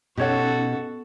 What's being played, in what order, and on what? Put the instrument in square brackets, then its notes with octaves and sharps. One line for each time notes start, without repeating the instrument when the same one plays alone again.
[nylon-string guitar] B2 [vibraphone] C#4 D#4 [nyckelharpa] F#4 A4 [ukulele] G4 C#5 F#5